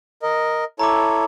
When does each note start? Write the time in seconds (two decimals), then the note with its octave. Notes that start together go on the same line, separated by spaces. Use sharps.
0.22 A#4 D#5
0.79 E4 A4 C#5 A#5 D6